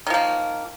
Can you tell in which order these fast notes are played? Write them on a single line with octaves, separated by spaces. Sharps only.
D#3 F3 A#3